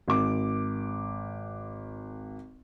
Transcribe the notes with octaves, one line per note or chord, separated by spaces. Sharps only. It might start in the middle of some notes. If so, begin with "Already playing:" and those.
G#1 D6